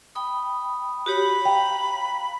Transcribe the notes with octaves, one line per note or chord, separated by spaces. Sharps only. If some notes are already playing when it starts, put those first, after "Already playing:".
G5 B5 D#6
F#4 G4 C#5 B5
F5 G5 A#5